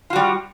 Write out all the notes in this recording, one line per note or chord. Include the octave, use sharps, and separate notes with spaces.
G3 F4 F#4